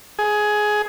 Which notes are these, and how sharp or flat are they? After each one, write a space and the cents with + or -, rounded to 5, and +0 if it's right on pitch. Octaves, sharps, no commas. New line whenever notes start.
G#4 +15